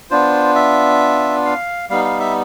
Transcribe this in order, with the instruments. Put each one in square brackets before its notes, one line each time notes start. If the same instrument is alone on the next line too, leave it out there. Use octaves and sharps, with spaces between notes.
[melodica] B3 D4 F4 C5
E5
F5
G3 B3 D#4 F5
F5
E5